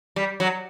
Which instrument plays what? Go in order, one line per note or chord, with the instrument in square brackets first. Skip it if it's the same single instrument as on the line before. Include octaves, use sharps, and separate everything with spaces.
[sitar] G3
F#3